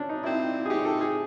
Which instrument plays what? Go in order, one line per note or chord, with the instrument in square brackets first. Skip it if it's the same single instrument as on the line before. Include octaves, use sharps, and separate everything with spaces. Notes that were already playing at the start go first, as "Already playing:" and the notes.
Already playing: [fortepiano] C#4 D4
D#4
[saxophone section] A#2 G3 C4 D#4 [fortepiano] E4
[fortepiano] G#4
[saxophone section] A#2 G3 C4 D#4 [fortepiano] G4
[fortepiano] A4
G#4